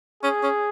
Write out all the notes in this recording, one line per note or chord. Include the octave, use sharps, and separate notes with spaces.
C#4 G#4
C#4